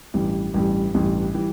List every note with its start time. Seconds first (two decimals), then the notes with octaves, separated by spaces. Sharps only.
0.14 A1 G2 E3 G3
0.54 A1 G2 E3 G3
0.94 A1 G2 E3 G3
1.34 E3 G3